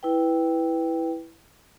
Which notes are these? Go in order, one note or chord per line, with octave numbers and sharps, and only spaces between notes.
E4 B4 G5